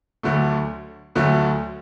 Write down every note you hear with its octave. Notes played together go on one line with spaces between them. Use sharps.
D2 D3 F#3 A3
D2 D3 F#3 A3